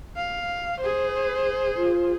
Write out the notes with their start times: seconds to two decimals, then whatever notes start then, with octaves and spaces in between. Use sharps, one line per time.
0.16 F5
0.81 G#4 C5
1.77 F4